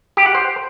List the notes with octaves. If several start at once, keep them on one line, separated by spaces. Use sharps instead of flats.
G4
F#5
C5